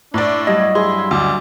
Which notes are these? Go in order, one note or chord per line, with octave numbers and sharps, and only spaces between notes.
A2 D4 D5
G2 F#3 D#5
E4 G#4 C6
D2 D5